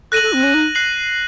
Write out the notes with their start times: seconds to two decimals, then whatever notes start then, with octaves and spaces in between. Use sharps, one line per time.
0.12 A4 F#6 A#6 D#7 F#7
0.22 A4
0.33 C4
0.43 C#4
0.54 D#4
0.75 F#6 C7 F#7